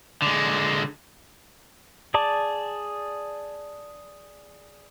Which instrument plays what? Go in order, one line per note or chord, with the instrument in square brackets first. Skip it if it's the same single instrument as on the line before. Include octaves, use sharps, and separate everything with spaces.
[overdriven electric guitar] D3 G#3
[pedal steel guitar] G#4 D5 A5 D6